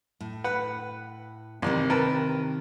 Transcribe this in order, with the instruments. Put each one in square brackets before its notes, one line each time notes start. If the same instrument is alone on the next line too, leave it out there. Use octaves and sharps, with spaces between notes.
[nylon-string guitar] A2
[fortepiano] B4 F#5
[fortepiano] A1 [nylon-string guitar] C3 D#3 C4
[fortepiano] A#4 B4 A5